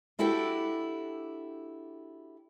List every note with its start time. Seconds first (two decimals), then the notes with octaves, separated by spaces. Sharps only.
0.19 D4 E4 F#4 G4 A4 G5